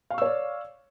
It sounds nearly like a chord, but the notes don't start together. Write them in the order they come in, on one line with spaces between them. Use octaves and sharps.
F5 C#6 E6 C#5 D5